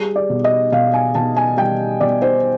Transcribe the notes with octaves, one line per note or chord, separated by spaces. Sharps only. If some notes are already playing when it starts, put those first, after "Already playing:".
Already playing: G3 G#4
D5
B2
D#5
B2 F5
G#5
B2 A5
G#5
G3 G5
B2 D5
C5